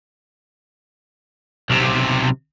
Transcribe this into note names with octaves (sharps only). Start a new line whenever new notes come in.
B1 C3